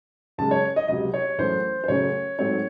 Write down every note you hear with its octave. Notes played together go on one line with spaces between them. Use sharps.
F#2 C#3 G#3 A5
C#5
D#5
C#2 C3 F#3 D#5
C#5
F#2 E3 A3 C5
C5
F#2 C#3 F#3 A3 C#4 C#5
G#2 F#3 A3 C4 C#5